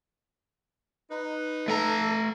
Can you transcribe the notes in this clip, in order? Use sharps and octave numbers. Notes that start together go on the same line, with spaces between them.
D#4 B4
A3 A4 A#5